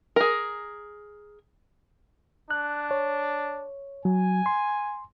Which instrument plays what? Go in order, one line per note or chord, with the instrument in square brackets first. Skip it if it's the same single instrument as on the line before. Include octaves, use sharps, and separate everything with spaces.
[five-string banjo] G#4 A#4
[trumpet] D4 [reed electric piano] F#6
[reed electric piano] C#5
[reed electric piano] F#3 [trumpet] G#5
[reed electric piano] C6